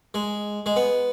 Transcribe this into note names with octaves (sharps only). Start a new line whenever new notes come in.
G#3
G#3
B3